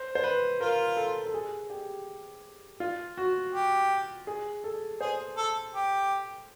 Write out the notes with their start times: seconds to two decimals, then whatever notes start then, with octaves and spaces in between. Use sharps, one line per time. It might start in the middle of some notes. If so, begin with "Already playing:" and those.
Already playing: C5
0.15 C5
0.24 B4
0.60 F4 A#4
0.97 A4
1.26 A4
1.34 G#4
1.70 G4
2.80 F4
3.17 F#4
3.53 G4
4.27 G#4
4.64 A4
5.01 G#4 C5
5.37 A4
5.75 G4